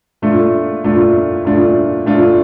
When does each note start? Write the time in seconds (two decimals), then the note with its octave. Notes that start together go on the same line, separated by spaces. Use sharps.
0.22 A#2 A3 D4 F4
0.84 A#2 A3 D4 F4
1.45 A#2 A3 D4 F4
2.06 A#2 A3 D4 F4